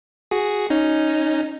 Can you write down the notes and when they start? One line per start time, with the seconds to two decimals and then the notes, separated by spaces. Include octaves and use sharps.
0.31 F#4 G#4
0.70 C#4 D#4